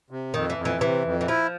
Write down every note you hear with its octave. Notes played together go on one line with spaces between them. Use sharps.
C3
F2 D#3
E3
F2
E3
C3 E3
F2
E3
F3 E4